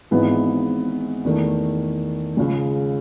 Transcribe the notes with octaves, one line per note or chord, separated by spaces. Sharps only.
G#1 G#2 E3 B3 D#4
E2 D#3 A3
C#2 C#3 G#3